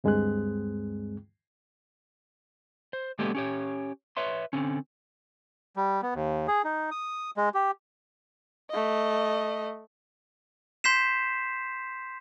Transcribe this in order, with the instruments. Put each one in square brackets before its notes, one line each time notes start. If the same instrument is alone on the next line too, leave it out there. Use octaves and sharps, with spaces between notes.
[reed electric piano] D2 G2 G#3 C4 G#4 F#6
[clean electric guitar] C5
G#3 A#3 B3 C#4 G4 A4
C#4 G4 C#5
B4 C#5 E5 C6
D3 C4 C#4
[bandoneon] G3
B3
D#2
G#4
D#4
D#6
G#3
G4
[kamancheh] A3 D#5
[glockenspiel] C6 G6 B6 C7 E7